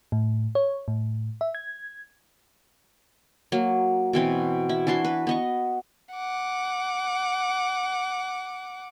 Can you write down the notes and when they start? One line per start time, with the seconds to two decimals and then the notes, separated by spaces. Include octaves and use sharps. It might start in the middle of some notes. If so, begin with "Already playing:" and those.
0.12 A2
0.55 C#5
0.88 A2
1.41 E5
1.55 G#6
3.52 F#3 A#3
4.13 B2 E3 C4
4.69 E4
4.87 E3 D4 F#4 C6
5.04 B4
5.27 B3 D#5 C#6
6.14 F#5 D6